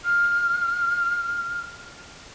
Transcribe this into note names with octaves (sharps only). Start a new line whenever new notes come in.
F6